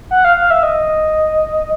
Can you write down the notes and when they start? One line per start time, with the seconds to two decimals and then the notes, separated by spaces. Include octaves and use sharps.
0.11 F#5
0.25 F5
0.37 F5
0.51 E5
0.63 D#5